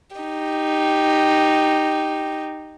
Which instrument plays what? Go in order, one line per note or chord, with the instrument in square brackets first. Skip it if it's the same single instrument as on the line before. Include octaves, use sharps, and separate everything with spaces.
[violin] D#4 G4